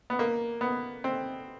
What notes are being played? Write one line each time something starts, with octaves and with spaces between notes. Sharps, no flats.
B3
A#3
B3
C4